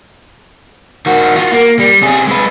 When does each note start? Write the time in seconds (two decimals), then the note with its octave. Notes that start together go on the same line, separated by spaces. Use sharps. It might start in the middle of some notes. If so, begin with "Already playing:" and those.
1.06 D#3 F#4
1.36 F4 F#4
1.52 A#3
1.79 G3
2.02 C3 G#4
2.27 G#3 B4